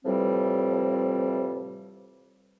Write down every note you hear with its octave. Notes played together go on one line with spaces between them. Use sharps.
A2 C3 E3 F3 G3 C4